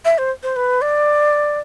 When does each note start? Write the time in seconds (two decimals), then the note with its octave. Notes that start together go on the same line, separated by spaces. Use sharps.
0.05 E5
0.18 C5
0.43 C5
0.56 B4
0.82 D5